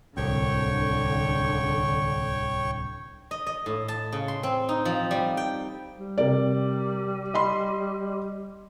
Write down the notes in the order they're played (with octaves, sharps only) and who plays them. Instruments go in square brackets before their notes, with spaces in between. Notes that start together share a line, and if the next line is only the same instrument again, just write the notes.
[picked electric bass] D1 C2 [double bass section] D3 [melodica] C#5 G5 C#6
[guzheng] D#5
D#5
A2
A5
C#3
C6
C4
D#4
F3
G3
G5
[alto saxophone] G3
[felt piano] C3 A#4 D5
D#5 B5 C6